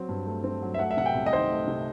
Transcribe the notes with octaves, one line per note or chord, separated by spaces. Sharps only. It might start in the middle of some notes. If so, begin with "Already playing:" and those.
Already playing: F#3 C4
G2
A3
C4
F#3
E5
A3 F#5
E5
C3 F#5
G5
C2
D#5
D#3 C5
A3
C3